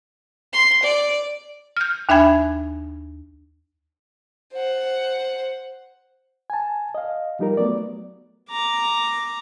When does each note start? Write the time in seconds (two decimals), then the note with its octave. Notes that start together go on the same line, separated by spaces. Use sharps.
0.53 C6
0.83 D5
1.77 F6 G6
2.09 D#2 D4 E5 G#5 B5 G#6
4.53 C5 F#5
6.50 G#5 A5
6.95 D#5 F5
7.39 F3 G3 D#4 G4 A#4
7.57 F#3 A3 B3 D5
8.49 A#5 D6